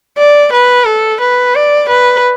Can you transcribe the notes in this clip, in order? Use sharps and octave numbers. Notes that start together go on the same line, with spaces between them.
D5
B4
A4
B4
D5
B4